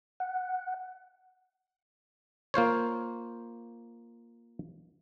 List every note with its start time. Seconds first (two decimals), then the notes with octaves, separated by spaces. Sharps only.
0.20 F#5
2.54 A#3 F4 C5 C#5